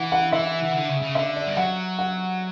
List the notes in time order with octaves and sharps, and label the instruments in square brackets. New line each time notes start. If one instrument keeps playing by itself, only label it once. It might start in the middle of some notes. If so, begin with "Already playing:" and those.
Already playing: [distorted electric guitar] E3 [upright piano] F#5
[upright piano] F#5
[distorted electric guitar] E3 [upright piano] E5
[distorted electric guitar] E3
D3
C#3
C#3
[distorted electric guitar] D3 [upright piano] E5
[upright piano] D5
[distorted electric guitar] G3
[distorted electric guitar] F#3 [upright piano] F#5
[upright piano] F#5